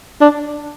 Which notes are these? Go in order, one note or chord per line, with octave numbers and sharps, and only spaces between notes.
D4